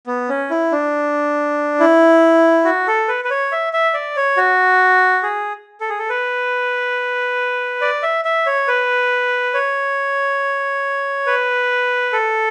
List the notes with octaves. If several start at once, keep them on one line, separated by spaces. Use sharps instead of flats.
B3
C#4
E4
D4
E4
F#4
A4
B4
B4
C#5
E5
E5
D5
C#5
F#4
G#4
A4
G#4
A4
B4
D5
E5
E5
C#5
B4
C#5
B4
A4